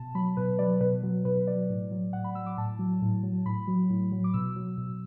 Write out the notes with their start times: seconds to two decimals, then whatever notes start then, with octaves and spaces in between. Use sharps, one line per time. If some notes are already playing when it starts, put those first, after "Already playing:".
Already playing: B2 A5
0.15 F#3 B5
0.37 B2 B4
0.59 F#3 D5
0.81 B2 B4
1.03 F#3
1.25 B2 B4
1.47 F#3 D5
1.69 A2
1.91 F#3
2.13 A2 F#5
2.24 B5
2.35 F#3 E6
2.46 D6
2.58 A2 A5
2.79 F#3
3.02 A2
3.23 F#3
3.46 A2 B5
3.68 F#3
3.90 A2
4.12 F#3
4.24 D6
4.34 B2 E6
4.56 F#3
4.78 B2